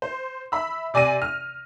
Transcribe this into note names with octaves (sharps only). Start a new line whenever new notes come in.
C5
E5 B5 E6
C3 D5 G#5 A#6 D#7
F6